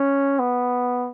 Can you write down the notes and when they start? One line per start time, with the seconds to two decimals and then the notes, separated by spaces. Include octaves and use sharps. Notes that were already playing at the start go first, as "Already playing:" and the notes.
Already playing: C#4
0.39 B3